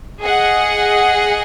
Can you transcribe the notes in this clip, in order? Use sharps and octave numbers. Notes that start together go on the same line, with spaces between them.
G#4 D#5 F#5